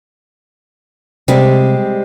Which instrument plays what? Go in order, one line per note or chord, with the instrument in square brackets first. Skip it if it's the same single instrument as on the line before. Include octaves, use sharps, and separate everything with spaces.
[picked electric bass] C3 [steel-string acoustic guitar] G3 G#3 C4